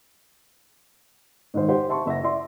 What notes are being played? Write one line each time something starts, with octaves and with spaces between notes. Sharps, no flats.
G#2 D#3 C5
G4 C5 F#5
E5 A5 C6 C#6
F#1 E5 F#5 A#6
E4 D5 E5 C6